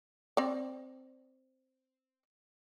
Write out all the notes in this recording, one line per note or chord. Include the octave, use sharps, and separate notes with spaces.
C4 D5